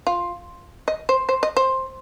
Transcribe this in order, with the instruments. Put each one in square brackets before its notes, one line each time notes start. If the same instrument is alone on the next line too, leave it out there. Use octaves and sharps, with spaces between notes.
[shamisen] F4
D#5
C5
C5
D#5
C5